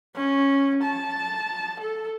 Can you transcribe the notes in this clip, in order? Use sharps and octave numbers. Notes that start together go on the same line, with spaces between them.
C#4
A5
A4